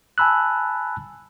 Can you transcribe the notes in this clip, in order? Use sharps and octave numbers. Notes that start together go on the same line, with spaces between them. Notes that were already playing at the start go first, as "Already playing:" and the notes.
G#5 A5 B5 E6 F#6